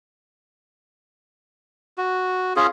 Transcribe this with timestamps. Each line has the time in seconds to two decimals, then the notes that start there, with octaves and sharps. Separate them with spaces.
1.98 F#4
2.56 C#4 F4 G#4